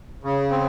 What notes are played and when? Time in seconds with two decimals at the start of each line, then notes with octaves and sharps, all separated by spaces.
0.23 C#3
0.51 C4